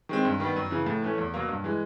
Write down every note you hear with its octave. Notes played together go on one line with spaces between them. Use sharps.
D#3 G#3 C4
G2
D#3 G3 B3
F#2
C#3 E3
A2
E3 A3 C#4
E2
B2 F#3 A#3
G2
E3 G#3